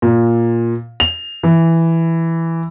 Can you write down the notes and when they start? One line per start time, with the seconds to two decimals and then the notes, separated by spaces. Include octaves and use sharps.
0.02 A#2
1.00 F7
1.43 E3